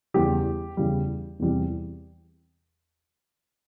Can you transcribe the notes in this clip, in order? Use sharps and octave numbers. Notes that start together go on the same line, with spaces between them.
E2 C#3 E3 G3 G4
E2 C#3 E3 G3
E2 C3 E3 G3